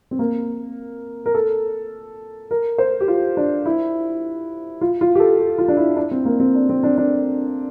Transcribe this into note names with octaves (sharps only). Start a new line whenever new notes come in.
C4
A#3
A#4
A4
A#4
C5
G4
F4
D4
E4
F4
F4
G4
A4
G4
F4
D4
E4
D4
C4
A#3
C4
D4
C4
D4
D4